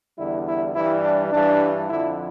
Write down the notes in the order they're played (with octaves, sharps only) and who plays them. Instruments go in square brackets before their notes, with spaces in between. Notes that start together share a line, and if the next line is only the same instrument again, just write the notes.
[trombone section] E2 D3 G3 E4
E4
G2 E3 G3 E4
D4
G2 E3 G3 D4
F2 D3 F3 E4